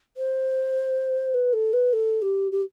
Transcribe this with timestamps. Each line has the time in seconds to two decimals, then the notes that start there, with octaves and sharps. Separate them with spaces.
0.17 C5
1.34 B4
1.53 A4
1.73 B4
1.93 A4
2.22 G4
2.52 G4